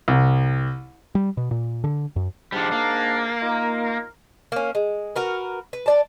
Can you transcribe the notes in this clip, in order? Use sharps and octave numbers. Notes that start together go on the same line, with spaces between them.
C2
G3
B2
A#2
D3
F#2
G#2 F3 G3 D4
A#3
D#4 F4 A#4
A#3 C#4
G#3
F#4 A#4 B4
B4
D4 D5 A5